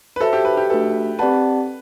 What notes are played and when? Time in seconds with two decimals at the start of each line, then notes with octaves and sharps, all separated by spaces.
0.16 B4
0.21 F#4 A4 C5 E5 A5
0.33 G4
0.45 B4
0.57 G4
0.69 A3 D4 F#4 A4 B4 E5
1.19 C4 G4 B4 D5 F#5 A5